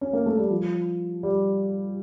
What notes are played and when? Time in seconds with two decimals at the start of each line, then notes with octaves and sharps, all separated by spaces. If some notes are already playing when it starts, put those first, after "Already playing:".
0.01 C#4
0.13 A#3
0.26 A3
0.38 G3
0.50 F3
1.23 G3